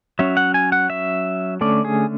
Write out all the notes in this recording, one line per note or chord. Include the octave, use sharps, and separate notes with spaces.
F#3 C#4 E5
F#5
G#5
F#5
E5
D3 A3 C#4 D5
G#4